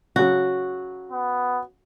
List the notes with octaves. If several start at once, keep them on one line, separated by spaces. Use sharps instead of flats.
C#3 F#3 F#4
B3